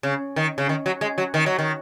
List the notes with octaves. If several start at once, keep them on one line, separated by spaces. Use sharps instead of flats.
C#3
D#3
C#3
D#3
F#3
G#3
F#3
D#3
F#3
D#3